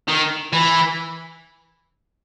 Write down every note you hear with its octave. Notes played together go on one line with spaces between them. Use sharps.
D#3
E3